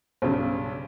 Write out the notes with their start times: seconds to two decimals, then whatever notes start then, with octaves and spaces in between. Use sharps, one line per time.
0.22 B1 G2 C#3